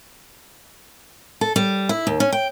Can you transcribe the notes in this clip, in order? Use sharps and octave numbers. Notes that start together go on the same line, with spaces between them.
A4
G3
E4
D#2
C#4
G5